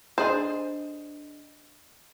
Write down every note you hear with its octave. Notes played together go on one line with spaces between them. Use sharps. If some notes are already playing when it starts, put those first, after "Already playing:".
D4 G#4 C5 D#5